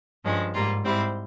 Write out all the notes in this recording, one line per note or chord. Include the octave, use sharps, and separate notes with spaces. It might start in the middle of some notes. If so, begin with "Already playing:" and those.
G2 F3 G#3 C#4
G#2 G3 A#3 F4
G#2 G3 C4 E4